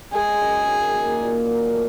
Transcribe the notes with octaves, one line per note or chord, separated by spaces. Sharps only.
G#3 G#4
F#2
D#3
A#3
A#2
F#3
A3